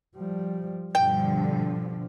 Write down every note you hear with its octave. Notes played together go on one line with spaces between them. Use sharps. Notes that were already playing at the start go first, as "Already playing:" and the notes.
F3 G3
G2 B2 D3 F3 G5